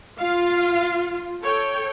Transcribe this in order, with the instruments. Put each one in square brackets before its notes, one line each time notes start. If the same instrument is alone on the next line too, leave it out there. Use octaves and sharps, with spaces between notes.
[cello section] F4 [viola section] F5
[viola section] A4 C#5 G5